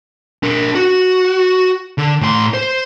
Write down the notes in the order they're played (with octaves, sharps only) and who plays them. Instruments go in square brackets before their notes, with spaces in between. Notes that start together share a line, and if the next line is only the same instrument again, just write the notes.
[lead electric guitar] D4 A#4
F#4
D3
A2 C6
C5